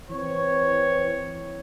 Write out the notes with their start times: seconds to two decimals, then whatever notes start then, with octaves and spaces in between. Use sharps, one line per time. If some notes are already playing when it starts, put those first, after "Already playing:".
0.11 E3 C4 C#5